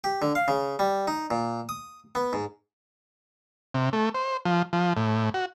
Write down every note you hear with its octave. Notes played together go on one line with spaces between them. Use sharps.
G4
D3
F5
C#3
G3
D#4
A#2
D#6
B3
G#2
C3
A3
C5
F3
F3
A2
F#4